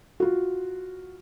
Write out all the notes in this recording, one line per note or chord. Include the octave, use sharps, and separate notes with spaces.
F4 F#4